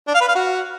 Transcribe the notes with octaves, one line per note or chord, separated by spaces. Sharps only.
D4
F5
B4
F5
F#4